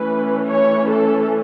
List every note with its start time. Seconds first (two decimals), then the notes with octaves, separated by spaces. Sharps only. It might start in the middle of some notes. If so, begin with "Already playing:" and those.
Already playing: E3 A3 C#4 B4
0.47 C#5
0.88 A4